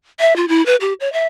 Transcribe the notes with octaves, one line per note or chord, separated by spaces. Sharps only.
E5
F4
E4
B4
G4
C#5
E5